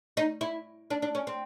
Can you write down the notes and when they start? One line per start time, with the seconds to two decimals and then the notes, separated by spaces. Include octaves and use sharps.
0.17 D#4
0.41 E4
0.90 D4
1.02 D4
1.15 C#4
1.27 C4